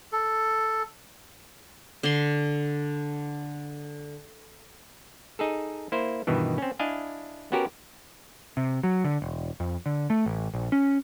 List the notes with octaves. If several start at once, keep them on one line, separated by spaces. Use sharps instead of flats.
A4
D3 C6
D#4 G#4 A4
A#3 E4 C5
G2 B2 D#3 E3
C4 C#4
D4 E4 D#5 F5 G#5
B3 C#4 F#4 G4 A#4
C3
F#3
D3
E1
F2
D3
A3
A1
A#1
C#4